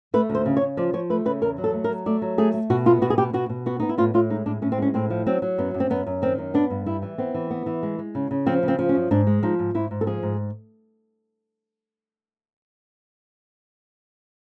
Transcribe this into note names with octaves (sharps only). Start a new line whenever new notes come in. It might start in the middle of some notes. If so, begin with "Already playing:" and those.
A3 B4
D2
C5
C#3
C#5
C#3
F3 D5
F3 C#5
A3 B4
C#3 B4
E2 A#4
F#3
A4
A3
A#4
F#3
A3 D5
F#3
A3 G#4
A3
B2 F#4
B3 F4
B2 F#4
G#4
B2 G4
B2 F#4
B2
B3 F#4
B3 D#4
E4
A2 F4
A2 F4
G#3 D#4
A2 D4
A2 C#4
C4
G#3 C#4
A2 C4
F3
F#3 C4
F#3
F#2 B3
F#2
C4
F#2 B3
F#2
D#3 C4
F#2
B3 D4
G2
G3 E4
E3
B3 C4
E3
B3
E3
G#3
G#3
C#3
C#3
F3 C4
C#3
C4
F3
C#4
F#2
G#2 D4
G#3
F3 D#4
G#2
G#2 E4
G#2
A4
F3 G#4
G#2